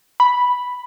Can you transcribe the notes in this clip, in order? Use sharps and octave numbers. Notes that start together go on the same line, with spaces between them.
B5